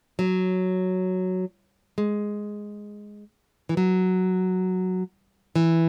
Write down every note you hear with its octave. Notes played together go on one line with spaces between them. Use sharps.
F#3
G#3
E3
F#3
E3